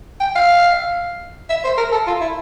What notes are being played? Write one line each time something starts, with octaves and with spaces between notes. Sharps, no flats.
G5
F5
E5
C5
A#4
A4
F4
E4